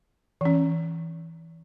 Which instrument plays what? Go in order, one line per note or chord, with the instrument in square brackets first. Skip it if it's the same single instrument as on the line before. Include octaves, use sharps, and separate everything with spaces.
[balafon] E3 C#4